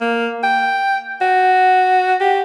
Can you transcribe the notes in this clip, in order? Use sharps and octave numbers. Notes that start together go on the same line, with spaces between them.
A#3
G5
F#4
G4